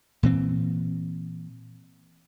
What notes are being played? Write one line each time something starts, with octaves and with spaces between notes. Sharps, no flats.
A#2 E3 C4